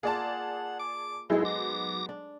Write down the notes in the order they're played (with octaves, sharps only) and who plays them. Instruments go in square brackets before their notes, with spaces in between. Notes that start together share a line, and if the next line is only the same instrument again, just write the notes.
[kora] A#3 F4 [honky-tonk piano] G#4 D5 A5 [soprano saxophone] F#5
[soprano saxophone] D6
[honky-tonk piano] F#3 D#4 [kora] G#3 A4 C5 [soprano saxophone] B3 [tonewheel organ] E4 G#4
[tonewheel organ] D6 A#6
[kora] D4